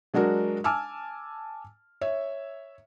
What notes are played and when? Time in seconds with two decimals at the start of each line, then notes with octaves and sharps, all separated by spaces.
0.14 F#3 G#3 D4 F#4 A#4
0.64 G#5 A5 D6 E6 F6
2.01 C#5 E5